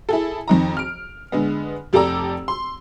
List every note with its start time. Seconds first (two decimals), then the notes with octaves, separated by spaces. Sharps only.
0.09 E4 G#4 A4
0.48 F2 D#3 A#5
0.77 F6 D7
1.32 D3 G#3 B3
1.93 F1 G4 A4 D5 A#5 E6
2.48 C6